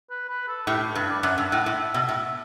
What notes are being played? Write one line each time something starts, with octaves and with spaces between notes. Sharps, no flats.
B4
B4
A4
A2 G4
G2 B4
D5
F#2 F#5
G2 E5
A2 F#5
A2 E5
B2
A2
E5